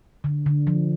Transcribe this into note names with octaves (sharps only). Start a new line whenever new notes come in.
D3
D3
F3